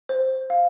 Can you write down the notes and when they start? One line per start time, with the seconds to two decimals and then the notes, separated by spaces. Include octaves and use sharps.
0.09 C5
0.50 F5